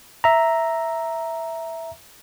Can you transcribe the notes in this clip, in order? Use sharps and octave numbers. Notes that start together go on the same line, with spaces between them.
E5 A#5